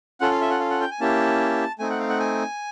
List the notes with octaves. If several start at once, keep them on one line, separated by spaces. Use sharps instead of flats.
C#4 F4 A4 F#5
F5
E5
F#5
F5
F#5
G5
G#5
A#3 C#4 E4 G4 A5
A3 C4 D#4 G#5
F#5
F5
F#5
G#5